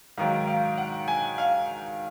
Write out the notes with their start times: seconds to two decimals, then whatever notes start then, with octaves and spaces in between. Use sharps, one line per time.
0.18 G#2 D#3 F#3 F5
0.47 F5
0.78 F#5
1.08 G#5
1.38 F5